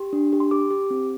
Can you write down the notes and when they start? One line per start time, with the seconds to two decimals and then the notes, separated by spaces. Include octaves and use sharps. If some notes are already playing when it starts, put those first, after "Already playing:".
Already playing: G4 C6
0.13 D4
0.33 G4
0.40 C6
0.51 G4 D6
0.71 G4
0.90 C4